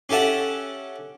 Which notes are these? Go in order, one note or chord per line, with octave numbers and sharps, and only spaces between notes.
C#4 G4 A4 E5 F#5